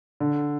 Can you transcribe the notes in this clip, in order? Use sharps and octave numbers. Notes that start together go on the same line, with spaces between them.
D3